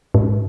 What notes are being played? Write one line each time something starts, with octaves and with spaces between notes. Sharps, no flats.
G#2